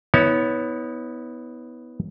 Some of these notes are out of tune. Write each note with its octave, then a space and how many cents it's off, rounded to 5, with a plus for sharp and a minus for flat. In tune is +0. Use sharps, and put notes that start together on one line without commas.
B3 +0 E4 -40 C#5 +10